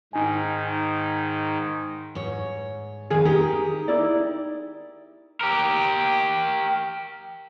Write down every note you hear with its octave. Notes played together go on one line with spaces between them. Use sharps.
G#2 D#3 D#4 G#5
G#2 C#5
F2 D#3 G#4 F5
D#4 G4 G#4 A#4
D#4 E4 D5
G4 A#4